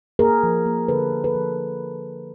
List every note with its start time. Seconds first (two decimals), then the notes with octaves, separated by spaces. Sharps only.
0.19 A#3 G#4 A#4
0.43 F3
0.66 A#3
0.88 D3 A4 B4
1.12 D3
1.24 A4 B4
1.35 F3